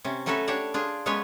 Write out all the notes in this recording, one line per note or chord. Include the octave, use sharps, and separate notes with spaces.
C3 C#4
F#3 A3 C#4 F#4 A4 B4
D4 G4 C#5 F#5
D4 F4 G#4
F#3 G#3 B3 C#4 B4 C#5